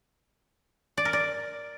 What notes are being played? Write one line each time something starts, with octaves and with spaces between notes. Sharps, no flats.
D5
A#4
D5